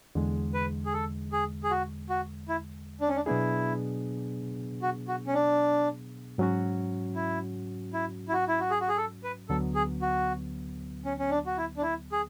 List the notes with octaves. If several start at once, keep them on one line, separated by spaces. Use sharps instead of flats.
E2 D3 G#3
B4
G#4
A4
G#4
G#4
F#4
F#4
E4
D4
C#4
D4
B2 F#3 B3 D4 E4 G#4
F#4
F#4
C#4
D4
G#2 F#3 C#4 F#4
E4
E4
E4
F#4
E4
F#4
G#4
F#4
G#4
A4
B4
D2 D3 F#3 B3 A4
G#4
F#4
C#4
C#4
D4
F#4
E4
D4
E4
G#4